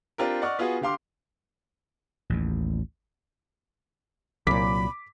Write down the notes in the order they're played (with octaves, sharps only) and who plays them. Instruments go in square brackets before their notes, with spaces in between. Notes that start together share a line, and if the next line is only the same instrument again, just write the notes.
[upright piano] C4 D4 F4 G4 A#4
D5 D#5 F#5 C#6 F6
B3 F4 F#4 G#4
D3 G4 F5 C6 D6
[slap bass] A1 D#2
[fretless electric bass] C2 A#2 [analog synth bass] F#3 [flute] B5 [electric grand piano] D6 B6